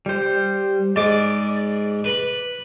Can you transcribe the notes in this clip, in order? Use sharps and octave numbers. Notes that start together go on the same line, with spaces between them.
G3 C5
G#2 D5 D6
B4 B5